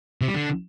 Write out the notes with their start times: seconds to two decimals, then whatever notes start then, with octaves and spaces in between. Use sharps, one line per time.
0.21 C3
0.28 G3
0.34 D3